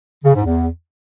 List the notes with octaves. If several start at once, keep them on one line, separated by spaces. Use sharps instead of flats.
C#3
G#2
E2